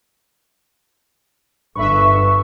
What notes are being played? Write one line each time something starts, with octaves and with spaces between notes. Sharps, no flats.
G1 B4 E5 C#6